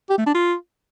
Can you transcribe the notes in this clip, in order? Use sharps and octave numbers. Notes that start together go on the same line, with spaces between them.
G4
A3
D4
F4